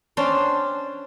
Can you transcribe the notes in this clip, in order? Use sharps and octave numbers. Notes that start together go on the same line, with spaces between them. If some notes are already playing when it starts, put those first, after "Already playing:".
C#4 D4 C5 G5